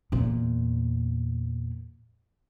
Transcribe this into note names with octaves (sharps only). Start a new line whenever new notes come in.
E2 A#2